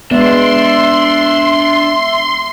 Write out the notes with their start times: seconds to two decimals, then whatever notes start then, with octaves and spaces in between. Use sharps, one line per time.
0.11 G#3 B3 D4 E5 C6